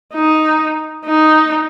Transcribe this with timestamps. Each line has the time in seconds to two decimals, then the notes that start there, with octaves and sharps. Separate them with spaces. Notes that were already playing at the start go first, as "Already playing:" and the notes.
0.14 D#4
1.06 D#4